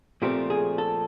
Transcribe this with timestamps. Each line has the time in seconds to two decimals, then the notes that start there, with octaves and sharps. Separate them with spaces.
0.22 A#2 F3 A3 C4 G4
0.50 G#4
0.78 A4